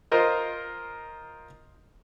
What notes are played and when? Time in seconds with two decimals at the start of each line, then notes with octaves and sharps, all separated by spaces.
0.12 F4 A#4 C5 D#5